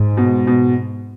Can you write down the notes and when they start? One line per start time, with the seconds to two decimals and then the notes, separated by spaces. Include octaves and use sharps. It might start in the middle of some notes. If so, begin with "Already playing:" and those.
Already playing: G#2
0.17 B2
0.47 B2